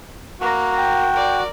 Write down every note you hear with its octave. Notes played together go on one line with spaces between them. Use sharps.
A#3 F#4 A#5
G5
A#4 D5